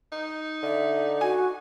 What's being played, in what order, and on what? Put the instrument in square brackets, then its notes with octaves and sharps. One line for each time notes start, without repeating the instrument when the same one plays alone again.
[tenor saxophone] D#4
[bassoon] D3 [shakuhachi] E5
[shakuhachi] F#4 [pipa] G#5